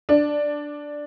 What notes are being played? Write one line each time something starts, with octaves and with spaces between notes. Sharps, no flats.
D4